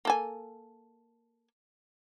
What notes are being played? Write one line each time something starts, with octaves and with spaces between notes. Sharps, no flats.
A#3 A4 G#5